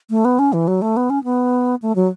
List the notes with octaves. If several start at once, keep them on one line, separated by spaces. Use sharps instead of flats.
A3
B3
C#4
E3
F#3
A3
B3
C#4
B3
A3
F#3